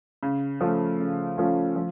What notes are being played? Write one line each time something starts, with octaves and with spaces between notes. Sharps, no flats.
C#3
F3 A3 C#4 F4
C#3
F3 A3 C#4 F4
F3